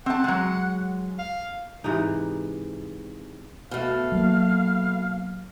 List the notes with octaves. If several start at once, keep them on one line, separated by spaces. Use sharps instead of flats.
C4 F#5 A5
F#3 G#3
F5
G#2 C3 E3 D#4
B2 A3 F5
F#3 A#3